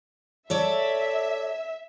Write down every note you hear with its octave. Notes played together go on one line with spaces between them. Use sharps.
A4 C#5 D5 E5